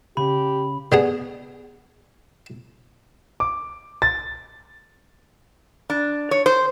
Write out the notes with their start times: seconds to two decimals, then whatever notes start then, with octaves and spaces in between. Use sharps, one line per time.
0.17 C#3 G4 B5
0.92 D3 B3 G#4
3.40 D6
4.02 A6
5.90 D4
6.31 C#5
6.46 C5